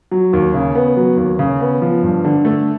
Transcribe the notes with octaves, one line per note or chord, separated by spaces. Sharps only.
F#3
D#2
C#3
B3
F#3
D#2
C#3
B3
F3
G2
D3
A3